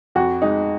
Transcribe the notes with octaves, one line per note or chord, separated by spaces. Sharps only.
F2 F#4
G#3 D#4